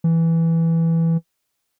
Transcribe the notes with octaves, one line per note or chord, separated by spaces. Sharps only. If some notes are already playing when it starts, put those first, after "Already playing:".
E3